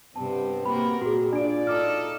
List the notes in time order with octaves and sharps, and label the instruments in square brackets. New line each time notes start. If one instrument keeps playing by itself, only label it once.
[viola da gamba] G2 C3 [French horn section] B3 C4 [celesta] A5
[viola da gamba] A#3 F#4 A#4 [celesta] B5
[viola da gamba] A#2 [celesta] F#4 G#4
[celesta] D4 D7 [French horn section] F4 D5
[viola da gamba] D#4 A4 [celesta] D6 F6